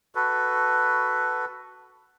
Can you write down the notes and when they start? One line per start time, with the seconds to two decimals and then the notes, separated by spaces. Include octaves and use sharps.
0.15 F#4 A4 B4